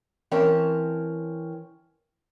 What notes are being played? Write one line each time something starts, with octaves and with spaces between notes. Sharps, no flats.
E3 C4 C#4 A#4 A5